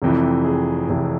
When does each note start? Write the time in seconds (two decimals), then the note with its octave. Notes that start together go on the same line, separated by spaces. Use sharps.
0.02 F1 F2 C3 E3
0.45 G#4
0.89 F1 F2 C3 E3